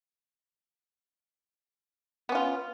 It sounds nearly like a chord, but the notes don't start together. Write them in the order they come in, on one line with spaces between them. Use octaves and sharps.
B3 C#4 F4